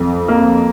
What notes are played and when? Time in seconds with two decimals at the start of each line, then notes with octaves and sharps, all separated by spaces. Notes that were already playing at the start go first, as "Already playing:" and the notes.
Already playing: F2
0.28 A#3